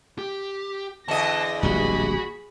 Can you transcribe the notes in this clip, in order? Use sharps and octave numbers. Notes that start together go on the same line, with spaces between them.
G4
E2 D3 D#5 A5 A#6
D1 A#1 G3 F#4 G#4 B5